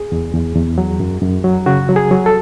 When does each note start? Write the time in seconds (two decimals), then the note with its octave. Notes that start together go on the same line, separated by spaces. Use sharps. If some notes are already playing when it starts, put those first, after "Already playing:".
Already playing: G#4
0.12 E2
0.34 E2
0.55 E2
0.78 F#3
1.00 F#2
1.22 F#2
1.44 F#3
1.66 C#3 F#4
1.89 F#3
1.96 G#4
2.11 F#3
2.26 A4